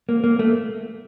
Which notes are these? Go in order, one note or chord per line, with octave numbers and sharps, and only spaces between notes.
A#3
A#3
A3